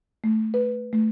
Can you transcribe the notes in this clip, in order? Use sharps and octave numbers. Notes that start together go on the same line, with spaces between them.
A3
B4
A3